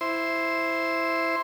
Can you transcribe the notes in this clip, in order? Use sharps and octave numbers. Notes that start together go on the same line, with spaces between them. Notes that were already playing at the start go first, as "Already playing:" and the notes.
E4 C5 C6